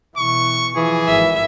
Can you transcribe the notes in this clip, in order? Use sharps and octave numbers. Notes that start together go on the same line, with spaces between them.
B2 E3 C#6
E3 F3 G#4
G#1 E5